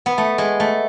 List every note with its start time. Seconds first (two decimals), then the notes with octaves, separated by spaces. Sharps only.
0.06 B3
0.18 A3
0.38 G#3
0.60 A3